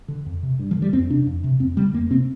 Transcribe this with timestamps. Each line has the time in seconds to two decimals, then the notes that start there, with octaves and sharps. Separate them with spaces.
0.08 D3
0.26 F2
0.43 C3
0.59 G2
0.71 F3
0.76 D3
0.82 G3
0.93 F2 C4
1.10 C3 D4
1.27 F2
1.44 C3
1.60 F2 C4
1.77 D3 G3
1.93 F2 A#3
2.11 C3 C4